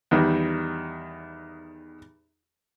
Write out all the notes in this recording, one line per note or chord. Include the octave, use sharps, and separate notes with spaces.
E2 D#3 G3